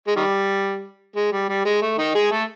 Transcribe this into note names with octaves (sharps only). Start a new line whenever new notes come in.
G#3
D#3 G3
G#3
G3
G3
G#3
A3
D#3 D#4
G#3 G#4
A3 A4